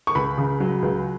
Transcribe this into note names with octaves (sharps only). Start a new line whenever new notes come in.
C#6
C#2 B5
C#3
F#3
C#2